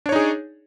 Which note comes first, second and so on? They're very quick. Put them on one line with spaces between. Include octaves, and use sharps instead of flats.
D4 C#5 D#4 G#4